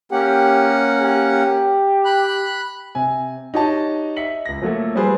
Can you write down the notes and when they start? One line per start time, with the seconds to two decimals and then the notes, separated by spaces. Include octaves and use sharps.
0.12 A#3 C#4 G4 F#5
1.01 G4
2.05 B5 F#6
2.95 C3 G#5
3.54 D#4 F#4 G4 C#5 D#5 A5
4.16 D#5 E5 B6 C#7 F#7
4.45 C#2 A#6
4.62 F3 F#3 A3 A#3 A4 E5
4.95 F3 G3 A3 G#4 B4 C5